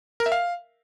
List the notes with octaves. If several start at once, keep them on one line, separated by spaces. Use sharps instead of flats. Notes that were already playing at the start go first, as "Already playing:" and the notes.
A#4
E5
F5